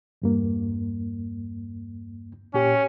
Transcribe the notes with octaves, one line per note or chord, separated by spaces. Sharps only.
E2 G2 A#3
A#2 C#4 G4